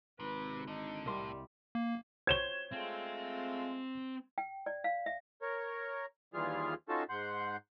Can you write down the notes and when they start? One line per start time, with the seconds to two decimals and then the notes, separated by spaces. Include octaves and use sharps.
0.20 G#1 C3 B4
0.67 D3 D#4
1.06 C2 A2 G3 A#4 C6
1.75 A#3
2.27 C5 C#5 G#6 E7 G7
2.72 G#3 A3 C4 F4
4.38 G5
4.66 D5
4.84 F5
5.06 E5
5.42 A#4 C#5
6.34 D#2 E3 G3 F4 G#4 F6
6.89 C#4 D#4 F4 F#4 A4 A5
7.09 G#2 F#5 C6 G6